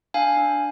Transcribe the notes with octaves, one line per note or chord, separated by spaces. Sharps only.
D4 F5 G#5
D4